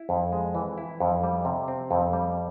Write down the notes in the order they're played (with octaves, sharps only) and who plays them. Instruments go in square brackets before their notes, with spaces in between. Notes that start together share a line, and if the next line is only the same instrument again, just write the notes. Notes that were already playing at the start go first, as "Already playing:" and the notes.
Already playing: [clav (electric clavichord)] E4
F2
G#3
E3
E4
F2
G3
C3
C4
F2
G3